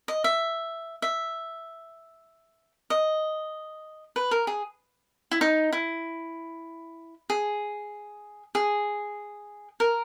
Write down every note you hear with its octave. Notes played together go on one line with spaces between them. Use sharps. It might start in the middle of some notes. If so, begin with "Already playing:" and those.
D#5
E5
E5
D#5
B4
A#4
G#4
E4
D#4
E4
G#4
G#4
A#4